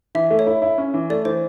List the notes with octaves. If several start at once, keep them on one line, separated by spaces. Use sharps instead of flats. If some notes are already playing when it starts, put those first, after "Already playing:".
E3 E5
A3
C#5
E4
E4
C#4
E3
A3 D5
E3 C5